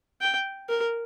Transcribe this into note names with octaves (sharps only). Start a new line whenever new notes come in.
G5
A#4